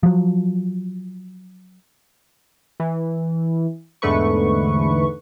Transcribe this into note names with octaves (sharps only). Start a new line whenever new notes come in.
F3 F#3
E3
E2 G#2 D3 A3 B4 C#6